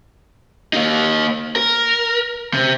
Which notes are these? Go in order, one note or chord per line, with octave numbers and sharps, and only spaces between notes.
A#3 D#4
A#4
C3